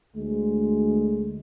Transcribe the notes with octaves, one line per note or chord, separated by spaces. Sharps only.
D2 G#3